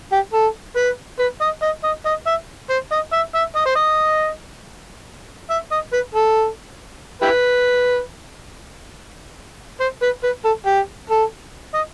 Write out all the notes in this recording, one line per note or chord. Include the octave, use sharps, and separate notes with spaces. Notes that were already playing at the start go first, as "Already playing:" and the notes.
G4
A4
B4
B4
D#5
D#5
D#5
D#5
E5
C5
D#5
E5
E5
D#5
C5
D#5
E5
D#5
B4
A4
E4 G4 B4
C5
B4
B4
A4
G4
A4
D#5